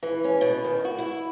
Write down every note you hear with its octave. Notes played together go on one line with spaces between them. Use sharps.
E3
C#4
B2
D#3
F#4
E4